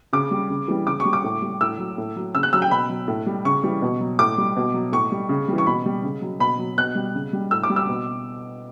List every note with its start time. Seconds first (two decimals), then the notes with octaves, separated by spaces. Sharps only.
0.13 C#3 D6
0.31 G3
0.50 C#3
0.68 E3 G3
0.86 C#3 D6
1.00 C#6
1.05 G3
1.13 D6
1.24 A2
1.42 G3
1.60 A2 E6
1.78 F#3
1.98 A2
2.16 F#3
2.35 C#3 E6
2.43 F#6
2.53 F#3 E6
2.62 G5
2.71 B2 B5
2.90 F#3
3.08 A2
3.26 G3
3.45 C#3 C#6
3.64 E3 G3
3.82 B2
4.01 F#3
4.19 A2 D6
4.38 G3
4.56 B2
4.74 F#3
4.92 A2 C#6
5.12 G3
5.29 C#3
5.48 E3 G3
5.58 C#6
5.67 B2 B5
5.86 G3
6.03 C#3
6.22 F#3
6.40 B2 B5
6.59 F#3
6.78 B2 F#6
6.95 G3
7.15 C#3
7.33 G3
7.51 A2 E6
7.63 D6
7.70 G3
7.76 E6
7.89 B2